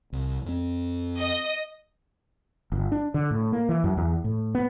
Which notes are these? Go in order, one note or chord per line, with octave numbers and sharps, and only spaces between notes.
C2
F2 C4
D#5
G1
D4
D3
A2
A#3
E3
F#2
E2
A2
B3